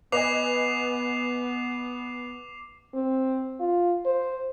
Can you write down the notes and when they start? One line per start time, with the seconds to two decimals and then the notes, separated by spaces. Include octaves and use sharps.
0.12 B3 B4 D#5 G#5 D6 C7 F7
2.94 C4
3.60 F4
4.05 C5